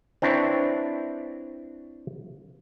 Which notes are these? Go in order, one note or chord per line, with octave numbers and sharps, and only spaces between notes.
C4 D4 E4 B4 C#5